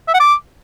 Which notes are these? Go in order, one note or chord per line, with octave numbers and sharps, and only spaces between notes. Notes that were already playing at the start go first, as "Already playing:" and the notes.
E5
F#5
D6